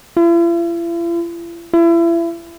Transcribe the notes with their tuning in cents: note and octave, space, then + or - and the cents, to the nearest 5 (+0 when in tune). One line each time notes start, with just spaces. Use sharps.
E4 +45
E4 +30